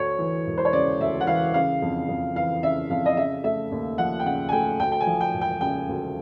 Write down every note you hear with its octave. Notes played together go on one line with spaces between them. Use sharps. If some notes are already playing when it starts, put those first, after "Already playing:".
Already playing: D2 C#5
E3
E1
C5
C#5
C#3 D5
D2 E5
F#5
E3 F5
C#3 F5
F2
F2
E3 F5
C#3 E5
F2 F5
D#5
C#3 E5
A3 E5
D#2
F3 F#5
G5
C#3 F#5
G#5
A3 G5
D2 G5
G5
G#5
F3
G5
E1
G5
C#3 G5
D2